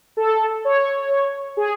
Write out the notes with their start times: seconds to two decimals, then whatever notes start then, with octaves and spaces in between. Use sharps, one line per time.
0.17 A4
0.65 C#5
1.57 G#4